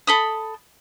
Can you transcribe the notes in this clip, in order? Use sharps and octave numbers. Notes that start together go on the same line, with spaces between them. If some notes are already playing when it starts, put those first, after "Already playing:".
A4 B5 D#6